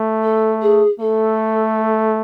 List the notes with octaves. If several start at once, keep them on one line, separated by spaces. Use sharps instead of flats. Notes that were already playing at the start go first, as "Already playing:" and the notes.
Already playing: A3
A4
G#4
A3 A4